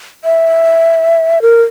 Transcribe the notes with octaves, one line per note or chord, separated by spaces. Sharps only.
E5
A#4